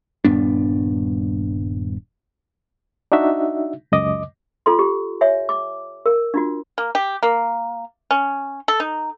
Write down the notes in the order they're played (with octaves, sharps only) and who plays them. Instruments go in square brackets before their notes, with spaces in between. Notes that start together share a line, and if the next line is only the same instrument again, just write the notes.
[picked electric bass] D#1 G2 B3 D4
[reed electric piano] D4 D#4 F#4 E5
C#2 F#2 D#5 D6
[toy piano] F4 A4 C6
G4
C#5 E5 G#5
D6
A#4
D4 F4 F#4
[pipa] A#3
G4
A#3
C#4
A4
D#4